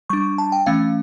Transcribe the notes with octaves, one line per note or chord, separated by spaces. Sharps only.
G3 D4 C#6
A5
G5
E3 A3 C#4 F5